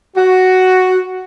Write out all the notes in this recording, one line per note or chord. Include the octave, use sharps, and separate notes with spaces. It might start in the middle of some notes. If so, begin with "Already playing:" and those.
F#4